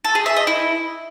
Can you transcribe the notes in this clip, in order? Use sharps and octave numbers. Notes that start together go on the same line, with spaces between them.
A4
G#4
E5
D#5
E4